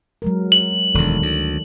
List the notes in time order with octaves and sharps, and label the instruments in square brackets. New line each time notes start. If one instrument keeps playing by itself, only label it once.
[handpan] F#3 G#3 A#4
[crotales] F#7
[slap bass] E1 D2 [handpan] D#3 A4 D5
[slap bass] D2